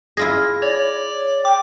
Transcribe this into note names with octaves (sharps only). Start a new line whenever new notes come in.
E4 F4 G#4 A#6
C#5 D5
G5 D6